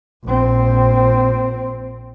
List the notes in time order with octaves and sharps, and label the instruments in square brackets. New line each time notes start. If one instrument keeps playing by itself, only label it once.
[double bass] A#1 C4